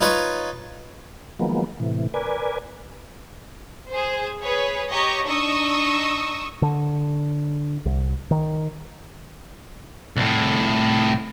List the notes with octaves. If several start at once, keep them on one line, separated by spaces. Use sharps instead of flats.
D#4 F4 B4 C#5
D#3 F3 F#3 G#3 A#3 B3
A2 C3 E3
A#4 B4 D5 G#5
G#4 C5
G#4 B4 C#5
G4 C#5 D#5 A#5 C#6
D4 D#4 D#5 C#6 D#6 E6
D3
C2
D#3
C2 A2